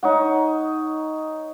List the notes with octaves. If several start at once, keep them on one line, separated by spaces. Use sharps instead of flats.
D#4 C#5 F#5